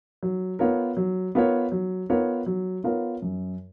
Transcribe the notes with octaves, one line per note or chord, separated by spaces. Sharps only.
F#3
B3 F4 A#4 C#5
F#3
B3 F4 A#4 C#5
F#3
B3 F4 A#4 C#5
F#3
B3 F4 A#4 C#5
F#2